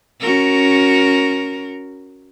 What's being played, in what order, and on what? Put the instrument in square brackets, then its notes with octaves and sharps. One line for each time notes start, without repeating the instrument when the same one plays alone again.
[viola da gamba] C#4 F#4 A#4